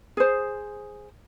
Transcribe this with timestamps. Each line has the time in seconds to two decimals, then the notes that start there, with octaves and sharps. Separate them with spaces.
0.17 G#4 C5